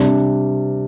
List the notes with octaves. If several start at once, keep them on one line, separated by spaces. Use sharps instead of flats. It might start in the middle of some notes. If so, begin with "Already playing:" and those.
Already playing: C3 G3 D4